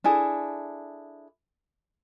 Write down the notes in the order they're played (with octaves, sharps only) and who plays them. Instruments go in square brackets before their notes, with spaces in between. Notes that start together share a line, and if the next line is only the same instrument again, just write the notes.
[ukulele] D4 E4 G#4 A4